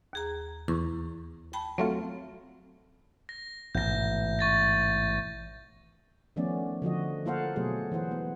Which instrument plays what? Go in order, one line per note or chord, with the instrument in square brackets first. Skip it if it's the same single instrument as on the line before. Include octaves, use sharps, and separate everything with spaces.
[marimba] D#2 G#4 A#5
[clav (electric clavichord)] E2 [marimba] C#6
[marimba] G5 A5 B5
[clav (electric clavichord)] F#3 A3 F4 [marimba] C4
[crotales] A#6
[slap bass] A1 G#2 B2 [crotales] G6 A#6
[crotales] C#6 A6 A#6
[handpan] D#3 F3 A3 B3 C#4 D5
D3 F3 F#4 D#5
A#3 F4 A4 C5 F5 F#5
B2 F#3 A3 G#4 A4
E3 E4 C5 F#5
B3